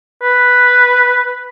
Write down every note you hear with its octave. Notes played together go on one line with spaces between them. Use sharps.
B4